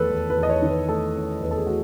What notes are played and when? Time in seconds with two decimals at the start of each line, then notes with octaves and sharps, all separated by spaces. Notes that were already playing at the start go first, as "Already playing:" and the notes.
Already playing: E2 D#3 A3 A4 B4
0.10 E2
0.30 B4
0.37 E2
0.43 D#5
0.50 C#5
0.62 D#3
0.69 B4
0.89 A3 A4
1.15 C#4
1.41 E2 B4
1.51 A4
1.58 G#4
1.67 A3 F#4